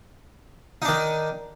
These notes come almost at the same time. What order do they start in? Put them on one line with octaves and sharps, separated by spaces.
D#4 D4 D#3